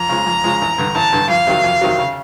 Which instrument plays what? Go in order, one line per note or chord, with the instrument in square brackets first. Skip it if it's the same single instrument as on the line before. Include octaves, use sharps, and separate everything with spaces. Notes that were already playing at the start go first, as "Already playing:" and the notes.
Already playing: [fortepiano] F2 [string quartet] A#5
[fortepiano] C#3 F3 G#3
F2
C#3 F3 G#3
A1
G2 D3
[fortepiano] A1 [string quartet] A5
[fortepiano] G2 D3
[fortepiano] F2 [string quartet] F5
[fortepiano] C3 D#3 F#3
F2
C3 D#3 F#3
C#3